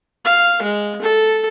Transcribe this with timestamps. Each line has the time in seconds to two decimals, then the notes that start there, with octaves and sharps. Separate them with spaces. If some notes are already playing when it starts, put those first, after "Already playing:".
0.25 F5
0.62 G#3
1.02 A4